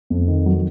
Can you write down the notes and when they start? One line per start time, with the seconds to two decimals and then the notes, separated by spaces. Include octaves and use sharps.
0.10 F2
0.28 D#3
0.46 F#3